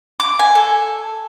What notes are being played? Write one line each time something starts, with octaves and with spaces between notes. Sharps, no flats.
D6
G#5
A4